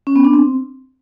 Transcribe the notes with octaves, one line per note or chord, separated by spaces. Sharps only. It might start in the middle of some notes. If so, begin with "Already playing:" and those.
C#4
B3
D4
C4